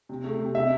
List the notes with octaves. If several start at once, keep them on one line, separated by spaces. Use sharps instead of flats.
C3
A3
C3
C3 E5